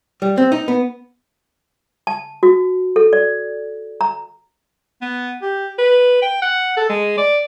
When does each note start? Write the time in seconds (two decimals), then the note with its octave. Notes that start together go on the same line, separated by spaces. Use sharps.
0.22 G3
0.37 C4
0.52 D#4
0.68 B3
2.07 A5
2.43 F#4
2.96 A4
3.13 D5
4.01 A#5
5.02 B3
5.42 G4
5.78 B4
6.22 G5
6.42 F#5
6.77 A4
6.89 G#3
7.18 D5